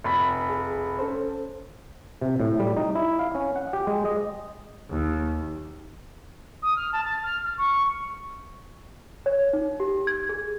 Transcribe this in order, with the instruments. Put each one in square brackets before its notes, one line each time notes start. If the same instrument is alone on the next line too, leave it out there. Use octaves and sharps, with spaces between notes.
[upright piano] F1 B5
[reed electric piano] G#4
C#4 A4 C5
[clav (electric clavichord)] C3
A2
G3
D#4
E4
F5
C#4
F#5
G4
G#3
D#5
[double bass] D#2
[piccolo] D#6
F6
A5
A6
F6
F6
C#6
[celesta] C#5
D#4
G4
G#6
G#4